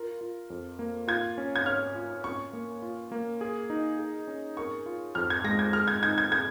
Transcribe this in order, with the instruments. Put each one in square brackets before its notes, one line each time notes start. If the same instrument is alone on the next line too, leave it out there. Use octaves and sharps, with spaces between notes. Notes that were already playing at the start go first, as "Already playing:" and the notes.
Already playing: [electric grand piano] F4 A#4
F4
F2
A#3
[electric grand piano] F4 [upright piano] G#6
[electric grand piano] C#4
[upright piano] G#6
[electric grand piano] C#5 [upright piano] F6
[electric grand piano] F4
[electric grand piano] C#4 [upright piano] C#6
[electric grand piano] A#3
F4
A#3
G#4
D#4
G#4
C#4
[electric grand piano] A#4 [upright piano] C#6
[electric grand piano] F4
[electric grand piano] F2 [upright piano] F6
[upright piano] G#6
[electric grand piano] G#3 [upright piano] A#6
[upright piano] G#6
[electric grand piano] G#4 [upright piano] F6
[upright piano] G#6
[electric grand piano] D#4 [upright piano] G#6
[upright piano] G#6
[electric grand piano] G#4 [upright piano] G#6